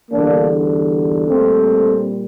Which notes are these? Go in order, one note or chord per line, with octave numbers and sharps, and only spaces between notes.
E2 D3 G3 A#3 D4
A#2 G3 A3 C4